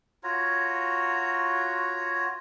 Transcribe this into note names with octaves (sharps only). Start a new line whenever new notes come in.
F4 F#4 C#5 A#5